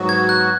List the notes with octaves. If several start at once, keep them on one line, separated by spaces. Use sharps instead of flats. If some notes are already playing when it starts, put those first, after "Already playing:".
Already playing: G#2 F#3 B3 F#4
G#6
F#6